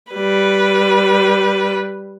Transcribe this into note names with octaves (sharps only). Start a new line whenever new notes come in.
G3 B4